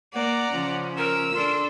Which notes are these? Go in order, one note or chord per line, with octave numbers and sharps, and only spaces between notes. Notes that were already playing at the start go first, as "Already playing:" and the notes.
A#3 D5 F#5 A#5
C#3 F3 C#4
A#4 A#5 E6
D4 A4 C6